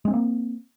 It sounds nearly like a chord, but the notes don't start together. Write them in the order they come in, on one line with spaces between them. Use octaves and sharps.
G#3 C#4 C4 A#3